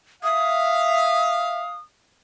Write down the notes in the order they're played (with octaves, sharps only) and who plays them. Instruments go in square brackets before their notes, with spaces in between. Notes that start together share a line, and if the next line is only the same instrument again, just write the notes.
[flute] E5 [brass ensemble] F5 [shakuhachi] D#6